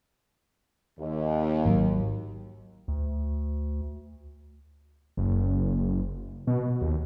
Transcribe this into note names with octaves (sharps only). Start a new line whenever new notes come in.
D#2
G#1 F#3
D2
F#1
B2
D#2